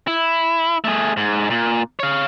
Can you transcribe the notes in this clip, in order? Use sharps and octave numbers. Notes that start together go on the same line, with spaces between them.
E4
A3 G#4
G#2
A#2
C#5 F5